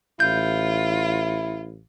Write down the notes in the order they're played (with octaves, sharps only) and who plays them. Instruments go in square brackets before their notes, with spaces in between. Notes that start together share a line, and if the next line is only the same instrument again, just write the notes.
[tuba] A1 [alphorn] E4 [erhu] F4 [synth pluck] G6